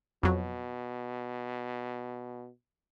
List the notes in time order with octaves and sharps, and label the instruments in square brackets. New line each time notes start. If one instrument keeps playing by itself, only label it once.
[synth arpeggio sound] F2 F#3 [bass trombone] B2